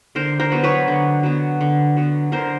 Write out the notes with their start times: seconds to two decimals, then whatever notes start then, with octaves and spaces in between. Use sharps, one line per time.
0.15 D3 A#4 C5
0.40 A#4 C5
0.52 F#3 B3
0.64 B4 C#5
0.88 D3
1.23 F#3 B3
1.61 D3
1.97 F#3 B3
2.32 D3 A#4 C5